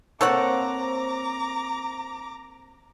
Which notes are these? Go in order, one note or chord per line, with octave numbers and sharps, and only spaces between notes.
A#3 C4 A4 C#5 F#5 A#5 D6